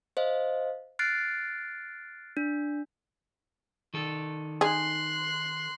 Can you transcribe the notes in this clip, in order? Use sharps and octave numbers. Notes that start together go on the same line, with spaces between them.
C5 D#5 F5
F6 F#6 A6 C7 D7
D4
D#3 A4
D#4 G#4 C6 F#6